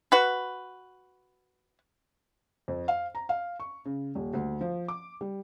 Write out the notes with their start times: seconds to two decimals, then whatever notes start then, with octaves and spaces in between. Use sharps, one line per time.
0.12 F#4 B4
2.68 F2
2.88 F5
3.15 A#5
3.29 F5
3.60 C#6
3.85 C#3
4.15 D#1
4.33 D2
4.61 F3
4.88 D6
5.21 G3